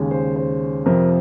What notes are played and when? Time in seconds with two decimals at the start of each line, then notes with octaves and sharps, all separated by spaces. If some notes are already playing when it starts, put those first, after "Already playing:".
Already playing: D#2 C#3 G#3 C#4
0.11 C5
0.36 C5
0.86 F2 C3 F3 A#4